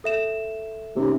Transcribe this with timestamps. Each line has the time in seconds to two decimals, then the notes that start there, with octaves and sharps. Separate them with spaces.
0.04 A4 E5 E7
0.96 C3 A#3 C#4 D#4